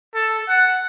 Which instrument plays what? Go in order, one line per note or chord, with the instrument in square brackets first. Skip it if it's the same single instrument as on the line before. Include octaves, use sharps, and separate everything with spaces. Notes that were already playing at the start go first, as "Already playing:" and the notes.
[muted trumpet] A4
F#5